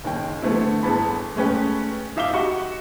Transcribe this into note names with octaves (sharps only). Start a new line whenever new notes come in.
F#1 D#2 D#3 G5
D3 E3 A3 B3 C4 E4
G1 B3 E4 G#4 A5 B5
G#3 A3 C#4 B4 G5
D#4 E5 F5 D6 G7
F#4 G4 D#5 C#6